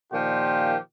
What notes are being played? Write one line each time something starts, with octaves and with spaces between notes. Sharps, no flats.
A#2 D#3 F3 F4 G4